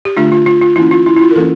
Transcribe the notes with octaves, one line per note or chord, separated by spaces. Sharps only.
G4
D3 A3 D4 F4
F4
F4
F4
E3 A#3 C#4 E4
F4
E4
E4
F4
A#4
E3 A#3 C#4 A4